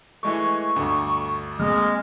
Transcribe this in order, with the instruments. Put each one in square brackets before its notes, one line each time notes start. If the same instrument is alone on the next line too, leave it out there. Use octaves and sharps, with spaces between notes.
[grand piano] E3 G#3 A3 [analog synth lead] C#6
[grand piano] G1 D2
[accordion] G#3 [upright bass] A#3 C4 [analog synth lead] F6